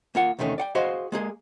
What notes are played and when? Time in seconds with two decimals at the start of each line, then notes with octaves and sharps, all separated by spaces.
0.15 A#3 F4 F#5
0.39 E2 C3 D#3 A3 C#4
0.58 D5 F#5 G5
0.75 F#4 G#4 C5 D#5 F5
1.12 G#3 A#3 G#4